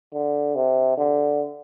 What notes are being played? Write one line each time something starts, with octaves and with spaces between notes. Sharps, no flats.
D3
C3
D3